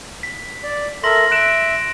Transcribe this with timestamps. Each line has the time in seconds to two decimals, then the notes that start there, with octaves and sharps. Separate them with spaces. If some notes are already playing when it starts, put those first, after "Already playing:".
0.23 B6
0.63 D5
1.04 A4 A#4 E5 C6 A#6 F#7
1.31 E5 F#6 D7 E7